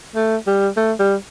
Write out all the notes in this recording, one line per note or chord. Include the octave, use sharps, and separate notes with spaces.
A3
G3
A3
G3